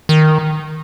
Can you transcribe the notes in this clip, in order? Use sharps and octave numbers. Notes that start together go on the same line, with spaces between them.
D#3